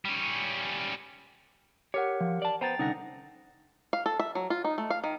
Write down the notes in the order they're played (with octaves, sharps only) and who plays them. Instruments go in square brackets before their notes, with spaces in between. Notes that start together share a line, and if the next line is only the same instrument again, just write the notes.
[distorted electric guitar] G3 C#4
[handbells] G4 A#4 F#5 [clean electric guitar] C#5
[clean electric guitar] F3
D5 A5
[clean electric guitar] B3 C5 [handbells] G5 A#5 A6
[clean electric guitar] C2 D3 D#4 [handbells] C#4 F#5 A#6
[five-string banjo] F5
A4
E5
F#3
F4
D#4
A3
F5
D#3